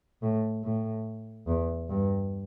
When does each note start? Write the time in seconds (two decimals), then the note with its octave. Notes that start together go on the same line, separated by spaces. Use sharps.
0.22 A2
0.64 A2
1.47 E2
1.89 G2